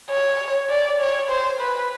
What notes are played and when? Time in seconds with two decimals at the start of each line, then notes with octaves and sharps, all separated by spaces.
0.10 C#5
0.70 D5
1.00 C#5
1.29 C5
1.60 B4